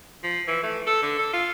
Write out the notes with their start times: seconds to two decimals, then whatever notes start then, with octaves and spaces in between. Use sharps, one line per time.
0.23 F3
0.47 E3
0.63 A3
0.87 A4
1.02 D3
1.18 A4
1.33 F4